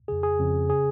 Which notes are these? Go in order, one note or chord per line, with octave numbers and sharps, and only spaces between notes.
F2 C#3 G#4
G#4
F2 C#3
C#3 G#4